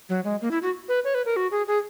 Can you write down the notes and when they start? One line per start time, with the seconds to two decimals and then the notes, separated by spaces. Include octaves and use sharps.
0.09 F#3
0.25 G#3
0.42 A#3
0.51 E4
0.62 F#4
0.89 B4
1.04 C#5
1.15 B4
1.26 A#4
1.36 F#4
1.51 G#4
1.67 G#4